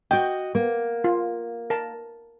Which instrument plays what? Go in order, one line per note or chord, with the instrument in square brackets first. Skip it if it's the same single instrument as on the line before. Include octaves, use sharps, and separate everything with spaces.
[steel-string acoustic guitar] F#4 D#5 [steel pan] G5
[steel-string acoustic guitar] A#3
[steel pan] F4
A#4 A5